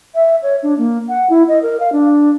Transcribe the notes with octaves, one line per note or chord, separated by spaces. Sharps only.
E5
C#5
D4
A#3
F#5
E4
D#5
A#4
F5
D4